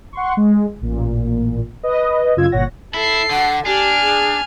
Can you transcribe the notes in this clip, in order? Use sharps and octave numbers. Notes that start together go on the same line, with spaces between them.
F#5 C6 C#6
G#3
A1 A#2
B4 D#5
F#2 C#3 F4 E6 G#6
G1 A#2 C#5 F#5 A#6
E4 A4 C7
D3 F#5
D4 G4 G#5 F6
G#4